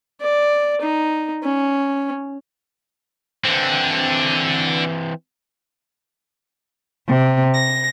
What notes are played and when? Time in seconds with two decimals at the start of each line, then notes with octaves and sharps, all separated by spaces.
0.22 D5
0.82 D#4
1.43 C#4
3.45 D3 E3 C4
7.07 C3
7.55 A#6